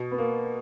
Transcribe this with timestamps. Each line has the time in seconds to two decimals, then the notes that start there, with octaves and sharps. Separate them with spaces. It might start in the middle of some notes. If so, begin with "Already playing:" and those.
Already playing: B2
0.11 B3
0.18 A#3